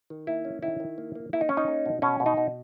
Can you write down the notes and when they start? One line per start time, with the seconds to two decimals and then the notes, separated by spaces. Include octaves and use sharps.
0.10 D#3
0.27 A#3 E4
0.45 C#4
0.63 D#3 E4
0.80 D#3
0.98 A#3
1.15 A#3
1.33 A#3 E4
1.41 D#4
1.49 C#4
1.57 D#4
1.68 A#3
1.86 B2
2.02 B2 C#4
2.20 B2
2.26 D#4
2.37 B2